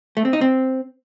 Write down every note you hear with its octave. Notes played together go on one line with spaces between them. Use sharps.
A3
C4
D#4
C4